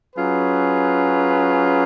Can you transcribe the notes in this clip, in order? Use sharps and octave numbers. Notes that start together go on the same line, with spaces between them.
F#3 C#4 F4 G#4 B4